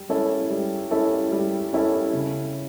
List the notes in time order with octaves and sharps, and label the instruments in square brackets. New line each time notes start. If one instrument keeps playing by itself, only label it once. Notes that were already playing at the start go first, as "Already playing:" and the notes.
Already playing: [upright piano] G3
C#4 E4 A4
G3
C#4 E4 A4
G3
C#4 E4 A4
C#3